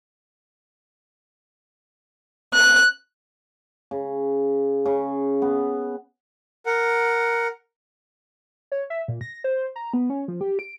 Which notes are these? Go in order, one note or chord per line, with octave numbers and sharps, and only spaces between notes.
F#6
C#3
C#3
B3
A#4 F#5
C#5
E5
A#2
A#6
C5
A#5
B3
C#4
F3
G4
D7